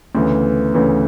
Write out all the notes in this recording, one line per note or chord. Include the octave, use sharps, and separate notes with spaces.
D2 C#3 E3 B3
D2 C#3 E3 B3